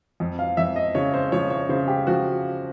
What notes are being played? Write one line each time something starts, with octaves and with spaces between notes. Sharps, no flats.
F2
F5
F2 E5
D#5
C#3 C#5
C5
F3 C#5
C#5
C#3 C5
G4
F3 F#4